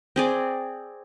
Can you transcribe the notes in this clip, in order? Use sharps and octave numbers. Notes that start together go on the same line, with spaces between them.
C4 G#4 D5